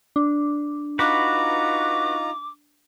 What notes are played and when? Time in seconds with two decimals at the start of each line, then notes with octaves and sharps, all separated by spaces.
0.16 D4
0.99 D#4 F4 F#4 B4 A#5 D6